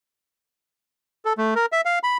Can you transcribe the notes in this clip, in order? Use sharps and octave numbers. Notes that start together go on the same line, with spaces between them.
A4
A3
A#4
E5
F5
B5